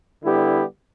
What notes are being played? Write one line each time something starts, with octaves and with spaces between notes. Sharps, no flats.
D3 G3 B3 E4 G4